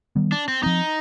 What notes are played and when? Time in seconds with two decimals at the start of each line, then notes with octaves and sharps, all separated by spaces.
0.16 D#3 G3 B3
0.32 D4
0.48 C4
0.63 F3 C4 D#4